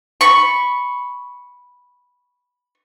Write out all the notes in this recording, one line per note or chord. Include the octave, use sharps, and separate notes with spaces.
B5 C#6